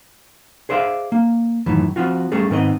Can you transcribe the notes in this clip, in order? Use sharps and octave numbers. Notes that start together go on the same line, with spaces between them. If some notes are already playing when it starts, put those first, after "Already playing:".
G#4 C5 D5 E5 F5
A#3
F#2 A2 D#3 E3
F3 C4 F4 F#4
G3 A3 C#4 G#4 A4
G#2 D#3 B3 C4 C5 D#5